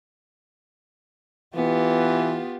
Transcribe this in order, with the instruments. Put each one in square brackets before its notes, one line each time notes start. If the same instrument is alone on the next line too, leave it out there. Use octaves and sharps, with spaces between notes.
[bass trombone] E3 [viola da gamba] B3 F4 G4